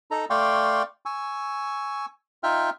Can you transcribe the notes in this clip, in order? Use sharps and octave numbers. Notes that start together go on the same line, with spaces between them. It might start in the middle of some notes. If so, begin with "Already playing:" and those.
D#4 A4 A#5
A3 D5 F5 G5 C6 C#6
G#5 C#6 E6
D#4 F4 E5 G5 F6